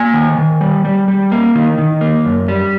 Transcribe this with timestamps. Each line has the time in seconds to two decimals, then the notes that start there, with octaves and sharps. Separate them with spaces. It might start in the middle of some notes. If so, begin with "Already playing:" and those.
Already playing: A#3 G#5
0.14 D#3
0.38 D#3
0.61 G3
0.85 G3
1.08 G3
1.32 A#3
1.55 D#3
1.78 D#3
2.01 A#3
2.25 F#2
2.48 G3